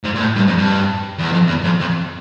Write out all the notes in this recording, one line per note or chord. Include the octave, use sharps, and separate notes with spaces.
G#2
A#2
A2
G2
F2
G2
E2
F2
E2
F2
F2